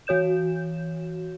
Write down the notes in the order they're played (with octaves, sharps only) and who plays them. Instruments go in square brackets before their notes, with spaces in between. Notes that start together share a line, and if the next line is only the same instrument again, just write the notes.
[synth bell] E3 F#4 C#5 G6 E7